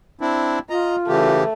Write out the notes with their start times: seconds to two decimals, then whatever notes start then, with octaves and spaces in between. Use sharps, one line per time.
0.21 C4 D4 E4
0.70 F4 D#5 A#5
1.08 C#3 E3 A3 G4